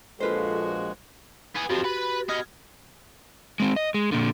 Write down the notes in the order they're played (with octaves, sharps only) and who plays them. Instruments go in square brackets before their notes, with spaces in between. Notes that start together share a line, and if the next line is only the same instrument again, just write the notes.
[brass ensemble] A#1 F3 F#4 [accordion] G#3 [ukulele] F4 B4 C5 [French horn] A4
[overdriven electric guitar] B3 G#4
[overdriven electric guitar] F2 F3 [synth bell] F#4 G4
[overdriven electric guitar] B4 B5
[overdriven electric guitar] B3 D#5 [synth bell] D#6 F6 G#6
[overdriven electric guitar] G#3 C4
D#5
G#3
A#2 D3